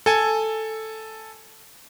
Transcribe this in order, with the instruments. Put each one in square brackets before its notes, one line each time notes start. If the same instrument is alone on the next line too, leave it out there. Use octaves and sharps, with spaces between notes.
[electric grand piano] A4 G#5